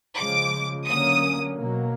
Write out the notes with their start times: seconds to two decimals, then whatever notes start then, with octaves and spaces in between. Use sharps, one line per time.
0.17 C#3 F3 G#3 D6
0.86 D3 F#3 A#3 C#4 D#6
1.56 B2 F#3 A#3